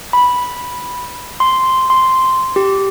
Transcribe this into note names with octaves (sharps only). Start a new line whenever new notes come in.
B5
C6
C6
G4